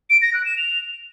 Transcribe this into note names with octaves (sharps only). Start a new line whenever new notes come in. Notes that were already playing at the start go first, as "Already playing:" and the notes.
D7
A#6
F#6
E7
F7